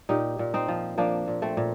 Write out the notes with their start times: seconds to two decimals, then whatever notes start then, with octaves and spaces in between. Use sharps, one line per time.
0.09 A#2 D#4 G4
0.39 A#2
0.54 C4 D#4
0.68 F3
0.98 F3 A#3 D4
1.28 A#2
1.42 A3 C4
1.57 A#2